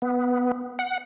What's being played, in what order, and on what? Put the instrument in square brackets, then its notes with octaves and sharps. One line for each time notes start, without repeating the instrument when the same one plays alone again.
[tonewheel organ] B3
F#5